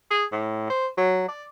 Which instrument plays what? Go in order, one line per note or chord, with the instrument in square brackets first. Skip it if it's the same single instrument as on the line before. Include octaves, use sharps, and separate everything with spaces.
[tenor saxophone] G#4
A2
C5
F#3
D5